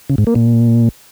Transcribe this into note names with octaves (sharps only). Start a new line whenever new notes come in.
C#3
G#2
A#3
A#2